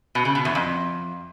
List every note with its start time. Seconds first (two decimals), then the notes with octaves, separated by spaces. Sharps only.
0.15 B2
0.25 C#3
0.35 B2
0.45 E2
0.55 F2